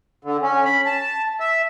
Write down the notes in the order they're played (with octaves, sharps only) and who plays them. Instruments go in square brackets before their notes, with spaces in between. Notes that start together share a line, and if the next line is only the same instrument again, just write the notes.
[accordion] D3
C#4
B5
A5
E5